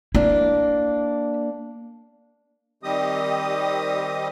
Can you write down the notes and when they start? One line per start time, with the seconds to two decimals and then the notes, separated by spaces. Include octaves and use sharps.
0.15 A#3 D4 E4
2.83 D#3 G3 C4 G4 D#5 D#6